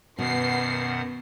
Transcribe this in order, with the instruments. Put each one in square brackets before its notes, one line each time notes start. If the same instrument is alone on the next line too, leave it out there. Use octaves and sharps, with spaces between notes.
[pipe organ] F#2 D#3 F#5 [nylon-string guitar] B2 [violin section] B3 C7